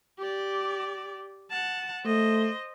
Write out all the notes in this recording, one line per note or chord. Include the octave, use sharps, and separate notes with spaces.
G4 D5
F#5 A5
A3 C5 D#5